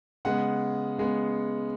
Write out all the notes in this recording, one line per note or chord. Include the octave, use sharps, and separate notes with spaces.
C#3 G#3 B3 F#5
C#3 G#3 B3